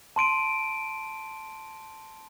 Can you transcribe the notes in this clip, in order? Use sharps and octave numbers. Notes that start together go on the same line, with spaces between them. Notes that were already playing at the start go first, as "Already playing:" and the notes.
A5 C6 D7 D#7